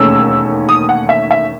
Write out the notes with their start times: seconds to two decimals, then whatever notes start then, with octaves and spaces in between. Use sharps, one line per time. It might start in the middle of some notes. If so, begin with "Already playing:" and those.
Already playing: E1 D#2 D#3 A3 C#4 E6
0.69 D#6
0.89 F#5
1.09 E5
1.31 E5